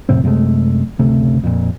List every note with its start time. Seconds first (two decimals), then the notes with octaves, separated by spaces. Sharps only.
0.09 F2 A2 C3 C4
0.23 F#2 C3 G#3 A3
0.99 F#1 D2 C3 A3
1.43 F2 A#2